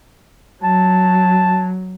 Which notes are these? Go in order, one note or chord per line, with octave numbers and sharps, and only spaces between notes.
F#3 A5